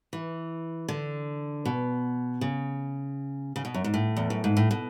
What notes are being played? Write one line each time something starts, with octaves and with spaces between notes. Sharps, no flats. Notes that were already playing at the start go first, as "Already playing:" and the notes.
E3
D3
B2
C#3
C#3
B2
F#2
G#2
A2
E2
F#2
G#2
A2
B2